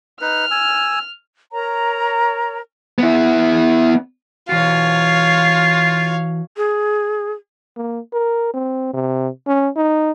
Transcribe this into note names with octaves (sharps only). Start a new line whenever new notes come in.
D#4 B4 F6
G#5 E6
A#4 C#5 A#5
B3 E4
E3 F4 F#4 C#5 F5
G#4
A#3
A#4
C4
C3
C#4
D#4